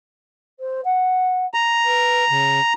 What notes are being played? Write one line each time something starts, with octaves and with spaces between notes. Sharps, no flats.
C5
F#5
A#5
B4
C#3